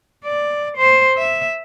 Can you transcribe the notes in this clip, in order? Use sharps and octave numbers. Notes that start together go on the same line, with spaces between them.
D5
C5
E5